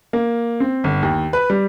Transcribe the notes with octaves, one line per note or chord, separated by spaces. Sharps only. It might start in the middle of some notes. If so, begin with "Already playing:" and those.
A#3
C4
G1
D#2
B4
G3